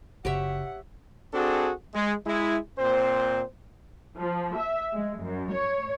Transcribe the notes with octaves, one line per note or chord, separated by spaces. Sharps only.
F#1 G4 C#5 E5 F#5
C4 D4 F#4 G#4 A4
G#3
G#3 E4
A#2 C4 C5
F3
E5
G#3
F#2
C#5